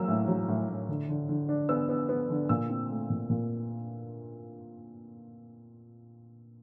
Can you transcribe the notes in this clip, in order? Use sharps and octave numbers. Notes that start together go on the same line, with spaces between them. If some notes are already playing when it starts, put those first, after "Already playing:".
Already playing: F#3 A#3 E6
A2
F#3
A2
A2
D3
D3
D3
D4
B3 E6
B3
B3
D3
A#2 E6
C4
A3
A#2
A#2